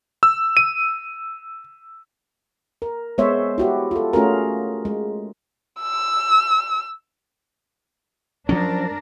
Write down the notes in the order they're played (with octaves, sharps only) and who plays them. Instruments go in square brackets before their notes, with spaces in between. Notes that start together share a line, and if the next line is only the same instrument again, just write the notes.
[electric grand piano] E6
D#7
[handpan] A#4
G#3 B3 C5 C#5 E5
E4 F#4 G4
F4 A4
A3 C#4 F4 F#4 G#4 A#4
G#3
[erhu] E6
[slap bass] F3 F#3 C#4 [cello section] D4 A#4